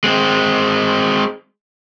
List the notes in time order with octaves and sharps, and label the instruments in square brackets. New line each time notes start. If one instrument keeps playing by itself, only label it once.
[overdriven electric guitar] G#3 C4